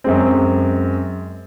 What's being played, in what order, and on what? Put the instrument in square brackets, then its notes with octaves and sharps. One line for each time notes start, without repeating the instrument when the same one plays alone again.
[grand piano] F#2 G#3 C4